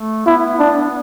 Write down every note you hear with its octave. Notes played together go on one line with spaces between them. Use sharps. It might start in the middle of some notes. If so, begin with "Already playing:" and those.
Already playing: A3
B3 E4
D4